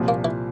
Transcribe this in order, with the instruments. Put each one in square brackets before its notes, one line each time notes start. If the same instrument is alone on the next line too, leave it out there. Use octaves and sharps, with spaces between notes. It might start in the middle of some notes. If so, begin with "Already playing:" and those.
Already playing: [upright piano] C2 A#2 F3
[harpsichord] A#3
E3